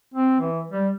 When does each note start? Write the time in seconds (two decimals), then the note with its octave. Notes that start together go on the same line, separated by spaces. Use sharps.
0.14 C4
0.41 E3
0.71 G3